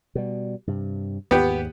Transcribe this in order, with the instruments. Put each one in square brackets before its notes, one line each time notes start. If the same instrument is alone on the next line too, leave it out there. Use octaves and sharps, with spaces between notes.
[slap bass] B2 G3
G2 C3
[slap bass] D#2 G#2 [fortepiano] B3 G4